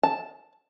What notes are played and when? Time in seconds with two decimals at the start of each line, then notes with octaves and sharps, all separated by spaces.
0.03 A5